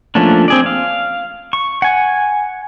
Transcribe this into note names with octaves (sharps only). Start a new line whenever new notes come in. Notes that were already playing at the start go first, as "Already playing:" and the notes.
F3 A3 A#3 C#4 D4
C4 G#4 D5
F5
C#6
F#5 G#5